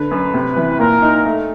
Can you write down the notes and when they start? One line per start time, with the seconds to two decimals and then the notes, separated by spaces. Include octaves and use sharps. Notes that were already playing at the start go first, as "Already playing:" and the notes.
Already playing: D3 B4
0.11 F#2
0.34 C3
0.56 E3
0.80 A#2 A#4
1.02 D#4
1.25 A3